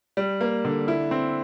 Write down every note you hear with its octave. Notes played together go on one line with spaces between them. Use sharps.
G3
A#3
D3
E4
C4